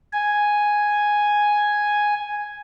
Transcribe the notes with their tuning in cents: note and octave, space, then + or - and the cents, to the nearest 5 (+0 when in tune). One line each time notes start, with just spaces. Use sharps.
G#5 +0